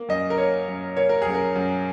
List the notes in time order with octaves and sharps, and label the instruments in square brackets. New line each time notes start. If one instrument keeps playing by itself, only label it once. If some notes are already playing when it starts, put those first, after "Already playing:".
Already playing: [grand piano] A#3
F#2 D#5
A#4
A#3 C#5
F#2
A#3 C#5
A#4
F#2 G#4
A#4
F#2